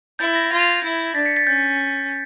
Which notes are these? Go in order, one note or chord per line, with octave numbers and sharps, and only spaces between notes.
E4 G6 A6
G#6 A#6
F4 G#6 A#6
E4
D4 A6 B6
B6 C#7
A6 B6
C#4 G6 A6